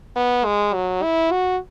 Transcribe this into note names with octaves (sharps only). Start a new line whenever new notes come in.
B3
G#3
F#3
E4
F#4